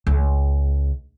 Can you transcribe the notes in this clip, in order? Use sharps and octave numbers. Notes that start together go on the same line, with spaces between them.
C#2